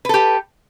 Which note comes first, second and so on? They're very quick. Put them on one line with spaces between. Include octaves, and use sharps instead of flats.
B4 A4 G4